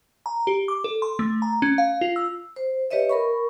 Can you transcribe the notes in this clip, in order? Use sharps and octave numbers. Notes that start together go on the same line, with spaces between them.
A#5
G4
D6
A4
C6
A3
A#5
C#4
F5
F4
E6
C5
G4 B4 C#5 D#5 E5
A#4 B5 C#6